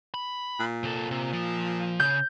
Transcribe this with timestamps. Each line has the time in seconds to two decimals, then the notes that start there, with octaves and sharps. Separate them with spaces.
0.14 B5
0.60 A#2
0.84 C3 A4
1.11 C3
1.33 F3
2.00 C#3 G6